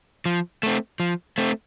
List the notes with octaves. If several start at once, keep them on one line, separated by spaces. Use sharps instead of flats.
F3
A3 C4
F3
A3 C4